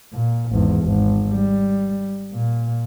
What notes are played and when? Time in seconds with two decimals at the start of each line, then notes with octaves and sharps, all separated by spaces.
0.13 A#2
0.51 G#1 E2
0.84 G#1
1.29 G3
2.34 A#2